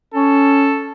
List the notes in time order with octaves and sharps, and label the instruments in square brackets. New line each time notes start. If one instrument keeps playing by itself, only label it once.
[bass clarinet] C#4 [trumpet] A4